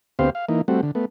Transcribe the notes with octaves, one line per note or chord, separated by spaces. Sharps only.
D2 B3 C4 G4 C5 F5
F5
E3 A#3 D#4
G3 A3 C4 F#4
D3
A3 B3